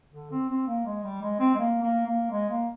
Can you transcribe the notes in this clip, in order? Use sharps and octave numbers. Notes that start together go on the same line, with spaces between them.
D3
C4
C4
A#3
G#3
G3
G#3
C4
G#3
A#3
A#3
A#3
G#3
A#3